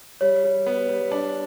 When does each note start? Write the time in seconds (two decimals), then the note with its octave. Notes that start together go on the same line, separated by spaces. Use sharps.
0.21 G3 C#5
0.44 G3
0.66 B3
0.89 G3
1.12 D4